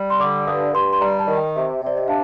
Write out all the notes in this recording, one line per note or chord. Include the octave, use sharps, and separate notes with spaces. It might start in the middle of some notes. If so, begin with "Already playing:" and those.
Already playing: G3
C6
D3 D6
G2 D#6
G2 C6
C6
G3 A#5
A5
D#3
G5
C3
C3 D5
D#5
D4 F5